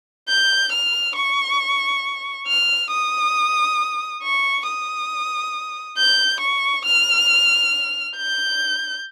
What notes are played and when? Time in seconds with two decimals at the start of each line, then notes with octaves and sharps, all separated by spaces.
0.29 G6
0.73 F6
1.16 C#6
2.48 F6
2.91 D#6
4.23 C#6
4.67 D#6
5.98 G6
6.41 C#6
6.86 F6
8.17 G6